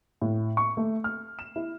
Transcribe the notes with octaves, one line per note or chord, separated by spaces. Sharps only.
A2
C#6
A3
F6
E7
E4